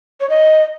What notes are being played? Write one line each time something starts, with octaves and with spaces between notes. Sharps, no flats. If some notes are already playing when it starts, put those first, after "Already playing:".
C#5
D#5